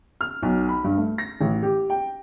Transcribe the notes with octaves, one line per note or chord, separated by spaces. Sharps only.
F6
B1
B5
G2
A3
A#6
A1
G4
G5